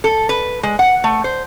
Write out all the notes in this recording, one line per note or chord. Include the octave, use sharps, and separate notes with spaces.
A4
B4
G#3
F#5
A3
C5